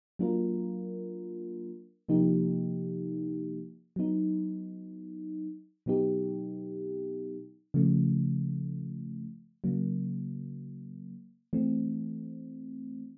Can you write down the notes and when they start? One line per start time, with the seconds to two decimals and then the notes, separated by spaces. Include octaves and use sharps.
0.19 F#3 A#3 D4 F4 A#4
2.09 C3 F3 A#3 D#4 G4
3.96 F#3 B3 D#4
5.86 B2 F#3 B3 D#4 G4
7.74 C#3 F3 A3
9.64 C#3 F#3 A#3
11.53 E3 A3 C4